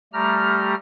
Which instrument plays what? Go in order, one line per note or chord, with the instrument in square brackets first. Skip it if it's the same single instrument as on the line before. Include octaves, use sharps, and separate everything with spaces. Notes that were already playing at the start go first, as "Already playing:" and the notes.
[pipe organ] G3 A3 G4 A#5 F6